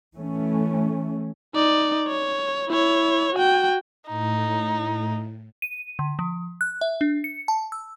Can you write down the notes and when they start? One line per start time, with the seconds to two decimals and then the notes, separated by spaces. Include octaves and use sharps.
0.14 E3 A3 C#4
1.55 D#4 D5
2.07 C#5
2.68 E4 C#5
3.35 F#4 G5
4.08 A2 D#4
5.62 D#7
5.99 D3
6.19 F3
6.61 F#6
6.81 E5
7.01 D4
7.24 C#7
7.48 A5
7.72 E6